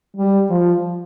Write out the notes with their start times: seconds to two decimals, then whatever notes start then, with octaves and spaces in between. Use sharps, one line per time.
0.16 G3
0.50 F3